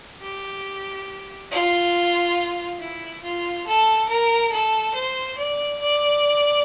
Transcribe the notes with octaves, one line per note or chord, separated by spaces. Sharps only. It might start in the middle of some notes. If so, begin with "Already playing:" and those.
G4
F4
E4
F4
A4
A#4
A4
C5
D5
D5